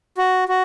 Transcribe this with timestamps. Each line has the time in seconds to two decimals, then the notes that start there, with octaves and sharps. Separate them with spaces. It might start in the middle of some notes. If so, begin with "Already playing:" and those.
0.17 F#4
0.48 F#4